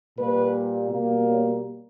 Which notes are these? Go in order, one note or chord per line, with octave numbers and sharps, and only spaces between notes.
A#2 G3 A#3 B4
B2 G3 A#3
C#5